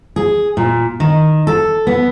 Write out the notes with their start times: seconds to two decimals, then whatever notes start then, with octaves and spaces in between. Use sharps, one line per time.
0.16 G#4
0.57 A#2
1.00 D#3
1.47 A4
1.87 B3